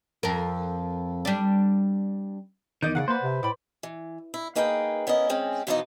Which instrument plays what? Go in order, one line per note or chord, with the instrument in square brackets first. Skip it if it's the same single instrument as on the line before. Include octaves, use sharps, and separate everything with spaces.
[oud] F2 A#4
G3 D4
[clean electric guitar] E2 D#3 [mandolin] D5 D#5 G6
[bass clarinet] C#3 [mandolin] D5 F5 F#5
[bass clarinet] A#3 [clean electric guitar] B4 C5
[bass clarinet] C3
[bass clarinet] A2 [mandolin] D5 B5
[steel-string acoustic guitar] E3
E4
A#3 D#4 G#4 B4 F5 G5
B3 C#4 E4 A#4 D#5
G#3 C4 C#4 G#4
B2 E3 F3 B3 D#4 D#5